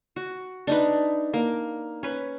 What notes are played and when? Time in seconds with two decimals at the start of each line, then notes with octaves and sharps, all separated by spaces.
0.16 F#4
0.67 D4 D#4 B4
1.33 A#3
2.03 C#4 B4